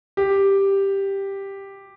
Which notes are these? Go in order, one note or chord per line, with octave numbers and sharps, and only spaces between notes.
G4